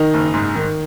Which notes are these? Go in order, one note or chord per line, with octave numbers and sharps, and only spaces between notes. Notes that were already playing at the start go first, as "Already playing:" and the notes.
Already playing: D#3 D#4
F#1
G#2
D#3